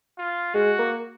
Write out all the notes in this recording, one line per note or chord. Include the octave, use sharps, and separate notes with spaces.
F4
G#3 F#4
A#3